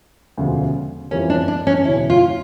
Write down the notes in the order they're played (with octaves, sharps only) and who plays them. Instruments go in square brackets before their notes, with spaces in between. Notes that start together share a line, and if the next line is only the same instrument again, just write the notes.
[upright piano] E1 D2 C#3 F3
[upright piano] F2 E3 G3 A#3 [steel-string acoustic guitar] C#4
[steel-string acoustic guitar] D4
D4
C#4
[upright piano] E1 D2 C#3 E3 [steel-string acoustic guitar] E4
[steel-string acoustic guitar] F4